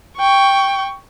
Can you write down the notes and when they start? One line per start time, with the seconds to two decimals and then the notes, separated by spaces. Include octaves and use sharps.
0.17 G5 C#6